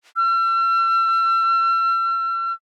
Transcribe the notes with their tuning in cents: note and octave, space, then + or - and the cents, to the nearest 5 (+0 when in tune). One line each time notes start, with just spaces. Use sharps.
E6 +45